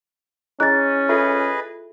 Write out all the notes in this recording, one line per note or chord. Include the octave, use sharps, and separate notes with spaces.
C#4 E4 G#4 D#5 F#6 A6
F4 G#4 A4 B4 D#5 E5